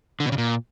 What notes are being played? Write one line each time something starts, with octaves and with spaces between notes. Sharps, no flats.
D3
B2
C#3
A#2